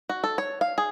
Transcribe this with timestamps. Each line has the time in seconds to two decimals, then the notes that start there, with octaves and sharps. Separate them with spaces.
0.09 F#4
0.24 A4
0.38 C#5
0.61 F5
0.78 G#4